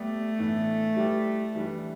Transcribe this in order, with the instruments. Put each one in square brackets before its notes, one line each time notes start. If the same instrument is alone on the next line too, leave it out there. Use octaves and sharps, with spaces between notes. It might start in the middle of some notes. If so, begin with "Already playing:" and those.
Already playing: [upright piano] G3 B3 G4 D5 [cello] A3
[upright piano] A2 E3 B3 D4
G3 E4 G4 B4 D5
E3 G3 D4 B4